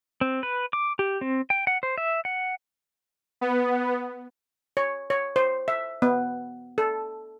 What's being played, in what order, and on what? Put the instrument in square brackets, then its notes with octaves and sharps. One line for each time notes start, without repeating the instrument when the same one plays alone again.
[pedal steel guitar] C4
B4
D6
G4
C4
G5
F#5
C5
E5
F#5
[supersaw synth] B3
[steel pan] C#5
C#5
C5
E5
B3
A4